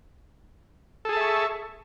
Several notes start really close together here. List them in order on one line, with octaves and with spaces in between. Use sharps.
A4 G#4 A5 E5 C#6